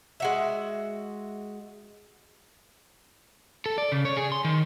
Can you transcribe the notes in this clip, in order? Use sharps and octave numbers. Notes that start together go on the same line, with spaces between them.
G#3 F#4 E5
A4
D5
C#3
C#5
G#4
C6
D#3